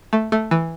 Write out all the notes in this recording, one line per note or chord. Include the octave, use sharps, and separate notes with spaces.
A3
A3
E3